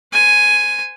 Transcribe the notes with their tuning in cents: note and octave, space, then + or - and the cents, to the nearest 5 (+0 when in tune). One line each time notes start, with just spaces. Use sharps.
C5 -25 G#5 +0